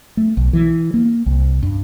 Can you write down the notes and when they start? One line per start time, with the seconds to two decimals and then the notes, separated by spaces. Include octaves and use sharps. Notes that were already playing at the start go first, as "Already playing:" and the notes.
0.17 A3
0.37 B1
0.53 E3
0.94 A#3
1.26 C2
1.62 G2